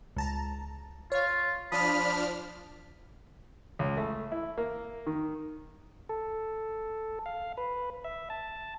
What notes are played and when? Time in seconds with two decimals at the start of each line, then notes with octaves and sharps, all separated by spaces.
0.16 C#2 A5 A#5
1.12 F4 C#5 F5
1.72 F3 D4 B5 D#6 F6
3.79 C#2
3.97 A3
4.32 E4
4.58 A#3
5.06 D#3
6.09 A4
7.26 F5
7.57 B4
8.04 E5
8.30 A5